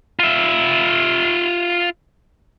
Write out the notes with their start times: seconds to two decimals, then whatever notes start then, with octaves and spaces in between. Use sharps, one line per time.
0.19 F4 E5